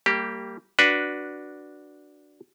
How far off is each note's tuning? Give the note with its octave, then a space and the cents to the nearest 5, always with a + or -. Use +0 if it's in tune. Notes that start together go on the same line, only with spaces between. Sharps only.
G3 -10 A#3 -25 G4 +0
D4 +0 F#4 +0 B4 -10